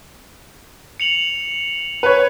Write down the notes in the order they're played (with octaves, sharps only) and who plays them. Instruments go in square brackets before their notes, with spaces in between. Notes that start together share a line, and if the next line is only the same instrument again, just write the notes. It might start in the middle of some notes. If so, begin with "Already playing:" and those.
[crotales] C#7 F7 F#7
[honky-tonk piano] B4 C#5